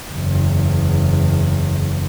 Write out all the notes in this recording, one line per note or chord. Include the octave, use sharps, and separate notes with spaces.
F#1 E2